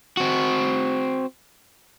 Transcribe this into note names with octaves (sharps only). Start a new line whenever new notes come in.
C4 F#4